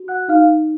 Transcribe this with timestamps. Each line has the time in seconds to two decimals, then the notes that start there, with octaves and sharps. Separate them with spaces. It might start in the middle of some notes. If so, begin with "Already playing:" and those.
Already playing: F#4
0.08 F#5 F#6
0.28 D#4 F5 F6